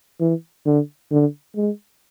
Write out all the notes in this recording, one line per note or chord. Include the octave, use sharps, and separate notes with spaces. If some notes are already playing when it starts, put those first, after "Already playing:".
E3
D3
D3
G#3